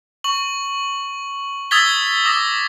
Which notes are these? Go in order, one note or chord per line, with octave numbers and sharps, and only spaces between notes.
C#6 F#7
D#6 E6 G#6 A6 B6 G7
D6 D#6 A#6 G7